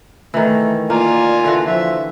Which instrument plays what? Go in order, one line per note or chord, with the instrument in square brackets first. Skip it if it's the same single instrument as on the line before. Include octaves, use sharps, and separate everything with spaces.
[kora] D#3 E3 [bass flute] A3
[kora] A#3 [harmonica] F4 G#5 [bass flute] D5
[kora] D3 E3 F#4
[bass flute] F3 [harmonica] E5